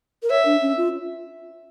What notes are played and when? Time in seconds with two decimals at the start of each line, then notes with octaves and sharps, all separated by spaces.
0.23 A#4
0.30 C#5 E5
0.46 D4
0.62 C#4
0.77 F4